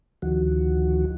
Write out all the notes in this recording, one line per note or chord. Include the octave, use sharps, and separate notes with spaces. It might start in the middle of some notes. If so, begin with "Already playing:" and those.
D2 D#3 F3 F#4